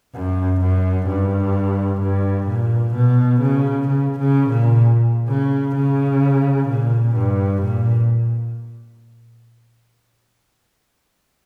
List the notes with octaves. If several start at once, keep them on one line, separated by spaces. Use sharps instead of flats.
F#2
F#2
G2
G2
A#2
B2
C#3
C#3
C#3
A#2
C#3
C#3
A#2
G2
A#2